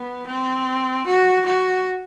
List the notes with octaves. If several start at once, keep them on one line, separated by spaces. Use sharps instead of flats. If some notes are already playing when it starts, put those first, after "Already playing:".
Already playing: B3
C4
F#4
F#4